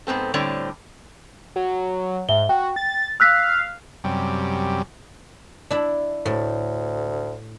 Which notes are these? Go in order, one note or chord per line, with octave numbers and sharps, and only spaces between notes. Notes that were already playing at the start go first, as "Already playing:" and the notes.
G#2 B3 C4 A4
A2 D3 G3 C4 C#5 D5
F#3
G#2 E5 G7
F#4 G5
A6
F5 E6 F#6 B6
F#2 C3 G3
D4 E4
D2 A2